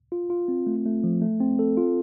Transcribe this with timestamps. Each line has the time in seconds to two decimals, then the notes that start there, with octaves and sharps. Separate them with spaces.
0.12 F4
0.30 F4
0.48 C4
0.67 A3
0.86 A3
1.04 F3
1.22 A3
1.40 C4
1.59 A4
1.77 F4